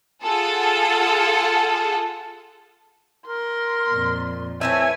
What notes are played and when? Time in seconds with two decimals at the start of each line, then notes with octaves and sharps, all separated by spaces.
0.23 F4 G#4 A4 F#5
3.27 A#4 C6
3.90 F2 A#2
4.61 A3 C4 E4 B4 C#5 E5 G#5